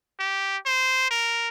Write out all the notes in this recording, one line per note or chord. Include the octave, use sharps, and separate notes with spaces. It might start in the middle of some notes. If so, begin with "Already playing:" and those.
G4
C5
A#4